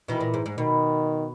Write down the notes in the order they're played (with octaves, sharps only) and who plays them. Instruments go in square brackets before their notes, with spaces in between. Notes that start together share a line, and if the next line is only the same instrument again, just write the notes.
[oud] B2 D#3 [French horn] E3
[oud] A#2
G#2
G#2
[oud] B2 [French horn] D#3